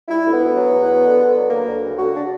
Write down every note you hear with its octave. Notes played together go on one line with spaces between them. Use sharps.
G3 E4
D2
B3
D2
F#3
E2
F#3
D3
D3
F#3
D2 A#3
D2
C#3
D2 F#4
D4